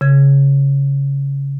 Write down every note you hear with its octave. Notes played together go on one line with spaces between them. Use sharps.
C#3 G#6